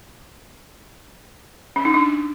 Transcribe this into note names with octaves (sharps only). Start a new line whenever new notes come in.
C#4
D#4
D4